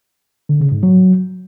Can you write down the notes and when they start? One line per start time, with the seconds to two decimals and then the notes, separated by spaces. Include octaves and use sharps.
0.49 D3
0.61 C#3
0.72 G#2
0.83 F#3